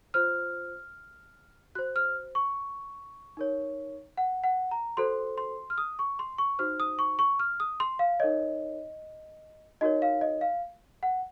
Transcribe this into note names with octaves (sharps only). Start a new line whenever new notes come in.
F4 C5 F6
F#4 C5 F#6
F6
C#6
D#4 A#4 C#5
F#5
F#5
A#5
F#4 A4 C5 C6
C6
F6
D#6
C#6
C6
C#6
D#4 F#4 C5 F6
D#6
C#6
C#6
F6
D#6
C6
F5
D#4 A#4 C#5 D#5
D#4 F#4 A#4 C#5 D#5
F5
D#5
F5
F#5